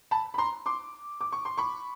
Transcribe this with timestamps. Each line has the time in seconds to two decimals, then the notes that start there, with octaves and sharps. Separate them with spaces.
0.11 A5 B5
0.34 B5
0.38 A#5 C6
0.66 C6 D6
1.21 D6
1.32 C#6
1.45 C6
1.58 B5 C#6